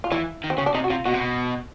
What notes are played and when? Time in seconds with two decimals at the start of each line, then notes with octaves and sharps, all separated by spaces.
0.04 F4
0.12 E3 E4
0.44 D#3
0.50 C4
0.58 C#3 C#4
0.66 D4
0.75 C3 D#4
0.84 F#4
0.90 C3 F4
1.05 B2 F#4
1.14 C3
1.20 B2